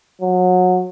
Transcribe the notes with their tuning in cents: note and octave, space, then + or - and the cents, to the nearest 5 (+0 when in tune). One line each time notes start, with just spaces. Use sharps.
F#3 -25